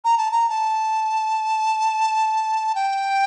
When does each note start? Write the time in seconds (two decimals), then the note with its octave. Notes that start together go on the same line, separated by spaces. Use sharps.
0.04 A#5
0.18 A5
0.32 A#5
0.49 A5
2.75 G5